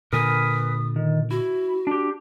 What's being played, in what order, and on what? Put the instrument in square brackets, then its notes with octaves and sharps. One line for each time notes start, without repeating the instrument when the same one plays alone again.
[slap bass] A#2 D3 [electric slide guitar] A#4 B4 G#5 [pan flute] D#6
[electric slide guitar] D#3
[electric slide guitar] E4 [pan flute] F#4
[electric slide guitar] D4 G4